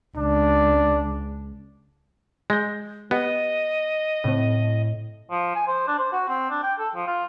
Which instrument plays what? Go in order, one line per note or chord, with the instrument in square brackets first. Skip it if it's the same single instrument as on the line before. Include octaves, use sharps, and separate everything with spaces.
[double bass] C#2 [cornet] D4
[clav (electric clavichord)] G#3 [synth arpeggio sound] G6 A#6
[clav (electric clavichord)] B3 [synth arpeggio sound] G4 [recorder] D#5
[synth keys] A2 [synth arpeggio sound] C#3 C4
[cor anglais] F3
G#5
C5
D4
C5
F#4
C4
D4
G5
A4
F3
F4